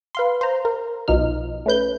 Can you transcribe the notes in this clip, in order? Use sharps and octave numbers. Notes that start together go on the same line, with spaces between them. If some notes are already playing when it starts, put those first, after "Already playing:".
B4 F5 C6
C5 A#5
A#4
B1 B2 F3 D#4 F6
A3 C#4 B4 G6